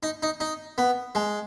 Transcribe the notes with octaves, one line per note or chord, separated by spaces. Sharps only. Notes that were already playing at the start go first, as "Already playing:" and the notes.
D#4
D#4
D#4
B3
G#3